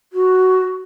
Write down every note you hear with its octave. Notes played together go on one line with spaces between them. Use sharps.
F#4